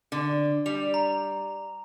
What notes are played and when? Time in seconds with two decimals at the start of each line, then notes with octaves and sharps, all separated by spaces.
0.12 D3
0.66 G3 F7
0.94 A#5